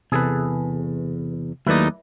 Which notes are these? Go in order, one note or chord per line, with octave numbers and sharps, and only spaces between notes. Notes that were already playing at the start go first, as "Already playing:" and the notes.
E2 C3 G#4 A4 B4
D#2 F#3 A3 D#4 E4 B4 D5